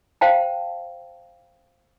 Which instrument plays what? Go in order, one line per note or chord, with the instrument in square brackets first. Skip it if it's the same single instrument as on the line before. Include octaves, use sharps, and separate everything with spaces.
[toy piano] C5 F5 G5 A5